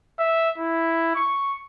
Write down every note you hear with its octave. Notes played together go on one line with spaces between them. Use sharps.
E5
E4
C#6